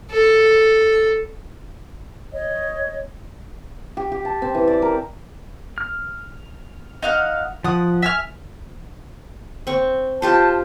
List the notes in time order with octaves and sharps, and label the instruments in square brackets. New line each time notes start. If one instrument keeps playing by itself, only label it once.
[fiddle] A4
[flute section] C#5 D#5
[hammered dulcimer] G4
G4
A5
C4
E3
D5
A#4
[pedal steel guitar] F6
[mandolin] D#4 F5 F#5
[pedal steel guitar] F3 [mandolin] F#5 D#6
[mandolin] E5 G#5 F6
[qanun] C4 C#6
[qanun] F4 G4 C5 [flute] A5